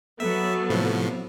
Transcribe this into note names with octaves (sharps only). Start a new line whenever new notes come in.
F#3 B3 A4 E5
A2 C3 F3